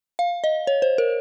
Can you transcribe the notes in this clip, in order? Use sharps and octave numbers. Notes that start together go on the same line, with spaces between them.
F5
D#5
C#5
C5
A#4